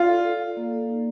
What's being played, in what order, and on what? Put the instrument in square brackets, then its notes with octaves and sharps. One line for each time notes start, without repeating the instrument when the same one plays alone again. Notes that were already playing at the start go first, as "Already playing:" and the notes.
Already playing: [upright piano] F4 [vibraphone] D5
[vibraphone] A4
A4
A4
A#3
D5
D#4